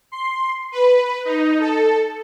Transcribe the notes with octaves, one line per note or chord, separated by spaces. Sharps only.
C6
B4
D#4
A4